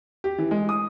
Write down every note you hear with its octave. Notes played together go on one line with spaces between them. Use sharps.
G4
E3
G#3
D#6